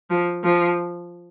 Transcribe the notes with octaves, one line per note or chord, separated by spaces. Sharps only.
F3
F3